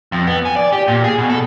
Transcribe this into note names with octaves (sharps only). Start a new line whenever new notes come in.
F2
B3
G#5
D5
G4
A#2
G#4
B2
A4